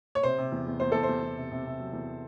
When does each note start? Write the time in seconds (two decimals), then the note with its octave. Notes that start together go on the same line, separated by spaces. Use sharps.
0.15 C#5
0.23 C3 C5
0.38 C3
0.52 E2
0.67 E2
0.80 E2 C5
0.92 E2 A4
1.03 C5
1.09 E2
1.22 E2
1.37 C3
1.52 C3
1.66 C3
1.80 F#3
1.93 E2